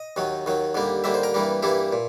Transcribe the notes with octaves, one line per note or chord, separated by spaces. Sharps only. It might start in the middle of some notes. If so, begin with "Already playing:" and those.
Already playing: D#5
D#2 D#3 F#3
D#2 D#3 F#3
D#2 D3 G3 A#3
D#2 D3 G3 A#3 E5
C5
A#4
G2 E3 G3 A#3
G2 E3 G3 A#3 E4
A#2